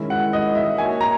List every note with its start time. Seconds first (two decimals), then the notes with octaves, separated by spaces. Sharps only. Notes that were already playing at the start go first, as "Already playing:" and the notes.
Already playing: D#3 G#3 C#4 E4
0.10 F#5
0.33 D#5
0.55 E5
0.78 A#3 D#4 F#4 C#5 G#5
1.01 A#5